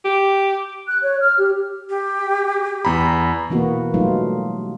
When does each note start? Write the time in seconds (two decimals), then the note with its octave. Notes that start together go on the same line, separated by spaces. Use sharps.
0.05 G4
0.87 F#6
1.03 C#5
1.21 F6
1.38 G4
1.90 G4
2.85 E2 A#5 B5
3.50 B2 E3 A#3 B3 F#4
3.94 F#3 G3 A3 D#4 F4